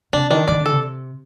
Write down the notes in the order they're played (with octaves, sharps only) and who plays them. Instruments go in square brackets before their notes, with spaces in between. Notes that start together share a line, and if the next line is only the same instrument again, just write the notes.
[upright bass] C3 [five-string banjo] D4
[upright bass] D#3 [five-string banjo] D4
[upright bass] D#3 [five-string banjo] D5
[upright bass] D3
[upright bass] C3 [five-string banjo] A4